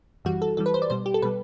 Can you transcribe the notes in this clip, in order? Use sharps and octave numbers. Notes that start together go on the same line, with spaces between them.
F#2 E3 G3 F#4
A4
F#2 E3 G3 A4
B4
C5
D5
B2 G3 C5
G4
A4
B2 G3 B4